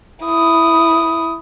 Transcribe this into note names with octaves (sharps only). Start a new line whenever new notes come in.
E4 D#6